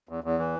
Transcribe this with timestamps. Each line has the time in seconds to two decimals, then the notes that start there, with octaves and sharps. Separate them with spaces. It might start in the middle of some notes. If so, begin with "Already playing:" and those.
0.09 E2
0.24 E2
0.39 E3